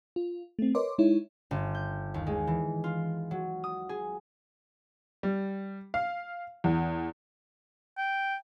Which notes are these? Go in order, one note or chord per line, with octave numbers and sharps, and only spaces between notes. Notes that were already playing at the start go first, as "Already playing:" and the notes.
F4
A3 C4
A#4 B4 C#5 D#5 C6 D6
G#3 D#4 E4 C#5
G1
G6
D#2
G#3
E3
F4
F#3
D#6
G#4
G3
F5
E2
G5